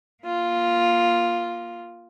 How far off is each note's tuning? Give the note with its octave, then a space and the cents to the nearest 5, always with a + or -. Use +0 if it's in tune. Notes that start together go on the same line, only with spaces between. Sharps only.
A#3 +25 F4 +0